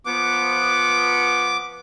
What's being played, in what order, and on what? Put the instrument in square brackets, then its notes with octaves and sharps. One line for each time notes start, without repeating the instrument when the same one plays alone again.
[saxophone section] F3 B3 [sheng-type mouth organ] D6